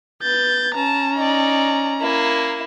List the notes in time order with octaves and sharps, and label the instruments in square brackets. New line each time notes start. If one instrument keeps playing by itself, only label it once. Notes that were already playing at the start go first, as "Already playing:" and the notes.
[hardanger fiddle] B3 [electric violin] G6 A6
[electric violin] C#4 A#5 [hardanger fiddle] A5
[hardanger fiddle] D#4 D5
A#3 E4